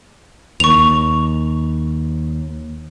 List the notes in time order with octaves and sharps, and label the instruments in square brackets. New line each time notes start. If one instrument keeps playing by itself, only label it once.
[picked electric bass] D#2 [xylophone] C#6 F7